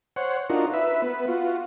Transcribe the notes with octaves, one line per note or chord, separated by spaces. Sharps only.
C5 C#5 F#5
D4 D#4 F4 F#4 A#4
B4 E5
B3 B4
F4 F#4